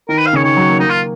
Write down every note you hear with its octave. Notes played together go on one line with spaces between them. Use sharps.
D#3 A#4
B4
F5
C#3 C#5
D#3 C#5
F#3
A#3
A#3 D#4
F4